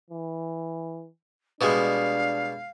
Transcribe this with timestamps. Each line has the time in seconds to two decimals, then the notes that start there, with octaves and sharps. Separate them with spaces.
0.10 E3
1.61 B2 G3 G#3 D4 F5